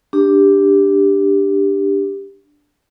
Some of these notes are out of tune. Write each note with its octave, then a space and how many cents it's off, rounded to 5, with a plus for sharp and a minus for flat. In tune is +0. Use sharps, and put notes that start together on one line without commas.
D4 +0 G4 +10